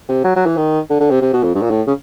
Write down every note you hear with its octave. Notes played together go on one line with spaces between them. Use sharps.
C3
F#3
F#3
E3
D#3
D3
D3
C3
C3
B2
F2
G2
A#2
A2
C#3